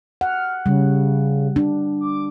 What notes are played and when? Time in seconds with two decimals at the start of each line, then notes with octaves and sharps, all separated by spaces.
0.21 F#5 F6
0.66 C#3 G3
1.56 D4
2.01 D6